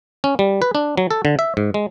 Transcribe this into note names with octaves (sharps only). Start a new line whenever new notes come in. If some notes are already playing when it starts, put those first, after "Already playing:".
C#4
G3
B4
D4
F#3
A4
D3
E5
G#2
G#3